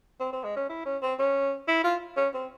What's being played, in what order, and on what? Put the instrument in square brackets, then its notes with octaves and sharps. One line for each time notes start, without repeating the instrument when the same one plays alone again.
[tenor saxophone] C4
C4
G#3
C#4
E4
C#4
C4
C#4
E4
F4
C#4
C4